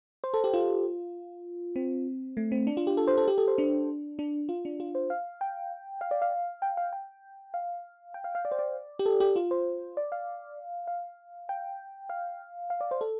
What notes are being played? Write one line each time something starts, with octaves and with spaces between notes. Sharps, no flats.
C5
A4
G4
F4
C4
A3
C4
D4
F4
G4
A4
C5
A4
G4
A4
C5
D4
D4
F4
D4
F4
C5
F5
G5
F5
D5
F5
G5
F5
G5
F5
G5
F5
F5
D5
C5
D5
G4
A4
G4
F4
C5
D5
F5
F5
G5
F5
F5
D5
C5
A4